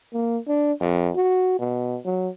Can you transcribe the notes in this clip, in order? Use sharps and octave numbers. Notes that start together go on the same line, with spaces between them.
A#3
D4
F2
F#4
B2
F#3